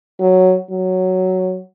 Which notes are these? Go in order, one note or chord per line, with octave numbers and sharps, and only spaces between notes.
F#3
F#3